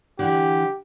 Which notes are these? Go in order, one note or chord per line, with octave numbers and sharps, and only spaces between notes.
D3 E3 G4